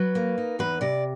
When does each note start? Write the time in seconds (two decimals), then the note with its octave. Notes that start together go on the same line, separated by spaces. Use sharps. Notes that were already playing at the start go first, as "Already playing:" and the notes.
Already playing: F#3 B4
0.15 A#3
0.38 D#4
0.59 E2 B4
0.81 C3 D5